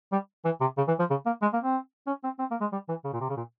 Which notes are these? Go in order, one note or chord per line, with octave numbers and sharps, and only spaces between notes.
G3
E3
C3
C#3
E3
F3
C#3
A#3
G#3
A#3
C4
C#4
C4
C4
A#3
G#3
G3
E3
C#3
A#2
C3
C#3
A#2